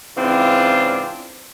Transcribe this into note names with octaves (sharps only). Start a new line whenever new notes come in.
G#2 C#3 E3 C4 D4 F4